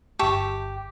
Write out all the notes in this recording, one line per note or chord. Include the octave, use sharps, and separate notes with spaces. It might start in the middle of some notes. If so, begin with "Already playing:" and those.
G1 G4 E5 A5 C#6 G6